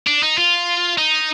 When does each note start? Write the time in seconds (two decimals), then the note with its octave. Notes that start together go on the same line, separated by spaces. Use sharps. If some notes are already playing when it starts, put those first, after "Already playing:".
0.07 D4
0.23 D#4
0.38 F4
0.98 D#4